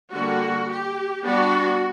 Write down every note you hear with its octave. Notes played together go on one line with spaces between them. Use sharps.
D3 G3 A#3 F#4
G4
G3 B3 D4 F#4